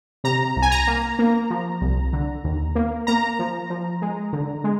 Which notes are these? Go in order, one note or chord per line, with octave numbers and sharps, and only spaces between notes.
C3 A#5
C2
G#5
A#5
A#3
A#3
F3
C2
D3
D#2
A#3
A#3 A#5
F3
F3
G#3
D3
G#3